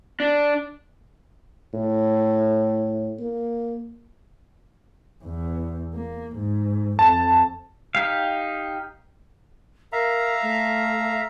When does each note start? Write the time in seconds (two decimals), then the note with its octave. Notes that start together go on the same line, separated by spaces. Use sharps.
0.20 D4
1.74 A2
3.19 A#3
5.24 E2
5.95 A#3
6.37 G#2
6.99 F2 A5
7.95 D#4 G4 F5
9.93 A#4 E5 F5 A#5
10.43 A3